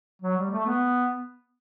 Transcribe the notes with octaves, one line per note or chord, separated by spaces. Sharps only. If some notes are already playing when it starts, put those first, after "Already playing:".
F#3
G3
A3
B3